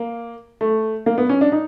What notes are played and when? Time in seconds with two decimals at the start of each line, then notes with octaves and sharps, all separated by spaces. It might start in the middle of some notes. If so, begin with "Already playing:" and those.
Already playing: A#3
0.61 A3
1.06 A#3
1.18 B3
1.29 C#4
1.41 D4
1.52 D#4